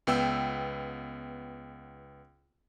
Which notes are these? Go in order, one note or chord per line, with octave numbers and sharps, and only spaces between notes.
C#2 B3 G5 E6